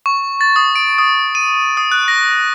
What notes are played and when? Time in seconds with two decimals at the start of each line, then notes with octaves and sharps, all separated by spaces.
0.06 C#6
0.41 A6
0.56 D#6
0.76 D7
0.98 D#6
1.35 D#7
1.77 D#6
1.92 F#6
2.08 A#6